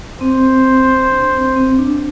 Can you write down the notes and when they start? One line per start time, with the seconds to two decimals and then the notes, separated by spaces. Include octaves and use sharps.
0.21 C4 C5
1.11 D4
1.34 C4
1.56 C4
1.79 D4